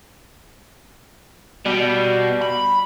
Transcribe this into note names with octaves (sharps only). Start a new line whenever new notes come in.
B2 G3
B5